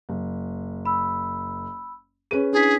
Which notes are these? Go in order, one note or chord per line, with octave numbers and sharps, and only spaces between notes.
F#1
B5 E6
C#4 G#4 B4 D#7
D4 E4 G#4 B6